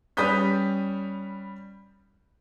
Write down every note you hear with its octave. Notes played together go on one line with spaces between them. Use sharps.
G3 C#4 B4 D#6 G6 B6